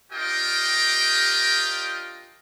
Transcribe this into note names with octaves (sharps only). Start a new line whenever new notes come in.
D4 F4 G4 A#4 D#5 G5